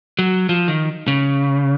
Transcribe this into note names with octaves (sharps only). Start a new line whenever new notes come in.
F#3
F3
D#3
C#3